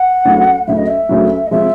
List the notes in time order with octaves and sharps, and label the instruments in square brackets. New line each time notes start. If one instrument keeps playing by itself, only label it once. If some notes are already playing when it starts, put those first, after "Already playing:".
Already playing: [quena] F#5
[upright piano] D2 C#3 F#3
[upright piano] D2 C#3 F#3 [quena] E5
[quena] D#5
E5
[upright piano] D2 C#3 F#3
[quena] D#5
[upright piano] C3 F3 G#3 [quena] E5